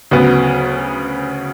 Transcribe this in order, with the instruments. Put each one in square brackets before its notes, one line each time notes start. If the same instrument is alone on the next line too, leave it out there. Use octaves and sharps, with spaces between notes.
[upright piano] D2 C#3 F#3 B3